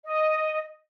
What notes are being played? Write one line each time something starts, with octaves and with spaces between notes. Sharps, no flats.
D#5